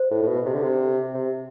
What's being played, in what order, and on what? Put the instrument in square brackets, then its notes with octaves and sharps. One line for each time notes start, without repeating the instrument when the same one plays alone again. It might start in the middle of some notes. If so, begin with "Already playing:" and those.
Already playing: [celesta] C5
[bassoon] A2
A2
B2
C3
D3
C3
C3